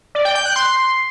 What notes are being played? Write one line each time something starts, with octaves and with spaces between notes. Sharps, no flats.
D5
G5
G6
F#6
C6